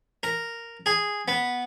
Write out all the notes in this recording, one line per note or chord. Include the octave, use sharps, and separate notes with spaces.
A#4
G#4
B3